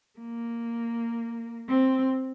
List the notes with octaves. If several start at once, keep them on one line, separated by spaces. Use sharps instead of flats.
A#3
C4